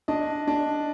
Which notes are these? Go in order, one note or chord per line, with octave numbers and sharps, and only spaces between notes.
D4 D#5
D4